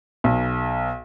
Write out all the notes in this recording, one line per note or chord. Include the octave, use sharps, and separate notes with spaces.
B1